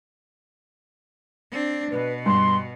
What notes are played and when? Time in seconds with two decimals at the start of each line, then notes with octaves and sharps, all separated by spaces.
1.51 C4 D4
1.91 B2 B4
2.26 G2 C6